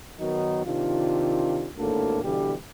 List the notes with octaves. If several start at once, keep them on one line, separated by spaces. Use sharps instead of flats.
D#3 F#3 B3 D#4 F#4 A#4
C3 D#3 D4 F4
G#1 D2 A2 D3 A#3 A4
B2 D3 E3 G3 G4